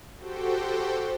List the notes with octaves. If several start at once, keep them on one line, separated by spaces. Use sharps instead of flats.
F#4 G4 A4 C5 G5